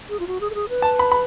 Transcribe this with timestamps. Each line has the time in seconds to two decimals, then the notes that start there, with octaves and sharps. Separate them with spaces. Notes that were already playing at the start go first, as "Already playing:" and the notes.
0.09 G#4
0.19 F4
0.27 F#4
0.40 G#4
0.50 A4
0.55 G#4
0.69 B4
0.82 A5
0.99 B5
1.12 B5